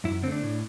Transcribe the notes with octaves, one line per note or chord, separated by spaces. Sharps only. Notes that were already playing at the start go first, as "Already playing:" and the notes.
F#2 E4
D3 C4
A3 D4
A2